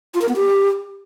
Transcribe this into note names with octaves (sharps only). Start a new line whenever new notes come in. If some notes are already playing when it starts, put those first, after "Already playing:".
F4
A#4
B3
G4